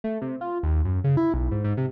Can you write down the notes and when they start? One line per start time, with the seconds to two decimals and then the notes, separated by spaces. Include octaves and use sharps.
0.04 A3
0.22 C3
0.41 F4
0.63 D#2
0.85 F#2
1.04 C#3
1.17 E4
1.34 B1
1.51 G#2
1.64 G#2
1.77 C3